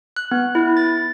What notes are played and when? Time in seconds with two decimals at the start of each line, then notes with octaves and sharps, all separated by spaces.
0.17 F#6
0.31 B3
0.55 E4
0.77 A6